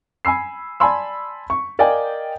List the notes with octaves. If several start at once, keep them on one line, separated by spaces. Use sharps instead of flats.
G#5 B5 E6 C7
D5 G#5 A5 B5 C6 E6
C#6
A#4 D5 D#5 F5 G5 G#5